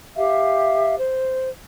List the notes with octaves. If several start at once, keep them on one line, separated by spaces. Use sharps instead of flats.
G4 E5 F5
C5